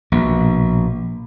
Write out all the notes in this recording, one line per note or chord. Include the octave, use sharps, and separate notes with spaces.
A#1 B2